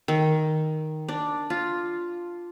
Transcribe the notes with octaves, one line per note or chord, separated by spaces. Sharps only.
D#3
D4
F4